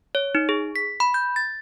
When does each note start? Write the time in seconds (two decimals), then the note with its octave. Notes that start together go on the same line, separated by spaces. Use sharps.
0.15 C#5
0.35 D#4
0.49 G#4
0.76 B6
1.00 B5
1.14 G6
1.36 A6